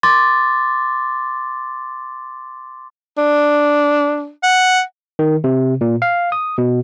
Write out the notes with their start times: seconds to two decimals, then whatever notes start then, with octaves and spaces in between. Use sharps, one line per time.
0.03 C6 D6 A6
3.18 D4
4.43 F#5
5.19 D#3
5.44 C3
5.81 A#2
6.02 F5
6.32 D#6
6.58 B2